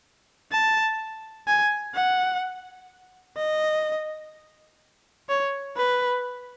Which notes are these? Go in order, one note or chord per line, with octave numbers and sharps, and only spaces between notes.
A5
G#5
F#5
D#5
C#5
B4